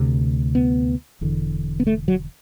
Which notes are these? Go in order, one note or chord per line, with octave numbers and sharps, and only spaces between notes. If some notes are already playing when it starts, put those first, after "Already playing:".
Already playing: D2 C3
B3
E1 E2 D3
B3
A3
F#3